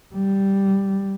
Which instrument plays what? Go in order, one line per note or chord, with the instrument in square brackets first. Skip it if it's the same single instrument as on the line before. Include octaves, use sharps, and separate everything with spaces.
[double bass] G3